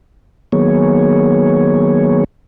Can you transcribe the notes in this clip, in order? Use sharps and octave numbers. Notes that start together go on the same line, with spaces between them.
D#3 F#3 A#3 B3 G#4 C#5